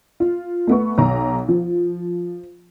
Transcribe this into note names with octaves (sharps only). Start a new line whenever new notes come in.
F4
A3 B3 C#6
B1 A#5
F3